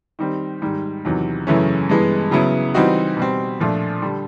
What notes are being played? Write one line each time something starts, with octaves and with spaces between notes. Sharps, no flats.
D#3 G3 C4
G#2 D#3 G3
E2 C3 D#3 F#3
F#2 C#3 E3 A3 C#4
G2 E3 G#3 B3
C#3 F#3 B3 E4
E3 G3 C4 D#4 F#4
B2 G3 C4
A#2 F3 A3 D4
D3 G3